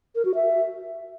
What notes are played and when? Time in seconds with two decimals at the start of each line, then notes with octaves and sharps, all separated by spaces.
0.15 A#4
0.25 F#4
0.35 E5